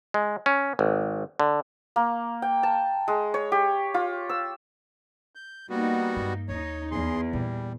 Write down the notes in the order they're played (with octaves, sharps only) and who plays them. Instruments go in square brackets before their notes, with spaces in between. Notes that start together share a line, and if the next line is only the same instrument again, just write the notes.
[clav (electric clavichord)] G#3
C#4
G#1
D3
[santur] A#3
G5
A5
G#3
C#5
G4
F4
E6
[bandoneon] G6
[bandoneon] G3 B3 F#4 [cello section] A#3 D#4
[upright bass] G2 G#3
[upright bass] D#2 [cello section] D#4 [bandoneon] C#5
[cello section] E2 [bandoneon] G#4 C6
[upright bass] A#2 E3 [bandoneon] G3